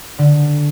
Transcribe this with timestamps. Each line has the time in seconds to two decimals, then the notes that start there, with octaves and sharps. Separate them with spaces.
0.18 D3